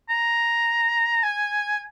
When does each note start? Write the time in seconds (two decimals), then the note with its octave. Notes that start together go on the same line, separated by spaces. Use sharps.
0.09 A#5
1.23 G#5